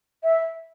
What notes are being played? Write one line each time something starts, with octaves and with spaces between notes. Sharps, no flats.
E5